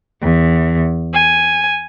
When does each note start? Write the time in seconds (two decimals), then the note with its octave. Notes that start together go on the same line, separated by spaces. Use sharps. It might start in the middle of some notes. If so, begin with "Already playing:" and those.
0.22 E2
1.13 G#5